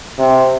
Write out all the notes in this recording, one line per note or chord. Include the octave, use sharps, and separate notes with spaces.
C3